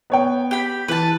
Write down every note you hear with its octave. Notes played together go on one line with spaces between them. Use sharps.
B3 C#5 G5
G4 B5
E3 B4 A5